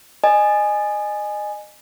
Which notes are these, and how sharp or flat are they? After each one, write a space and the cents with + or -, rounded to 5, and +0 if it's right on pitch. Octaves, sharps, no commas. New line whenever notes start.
D#5 -30 G#5 +0